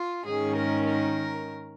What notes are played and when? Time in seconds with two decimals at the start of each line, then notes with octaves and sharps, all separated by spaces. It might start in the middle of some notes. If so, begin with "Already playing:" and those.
Already playing: F4
0.24 G#2 D#3 C#4 G#4
0.56 A#4
0.86 A#4